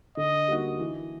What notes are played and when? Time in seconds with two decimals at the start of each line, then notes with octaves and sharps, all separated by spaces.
0.17 D3 D#5
0.48 G3 A#3 D#4 F#4
0.79 E3